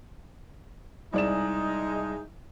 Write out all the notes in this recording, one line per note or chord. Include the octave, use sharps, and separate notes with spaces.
C2 G#3 D#4 D5 E7